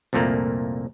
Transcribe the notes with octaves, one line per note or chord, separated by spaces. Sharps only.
C2 F2 A#2 A3 A#3